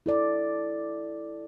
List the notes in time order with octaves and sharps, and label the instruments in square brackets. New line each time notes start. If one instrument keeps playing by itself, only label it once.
[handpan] E4 A4 D5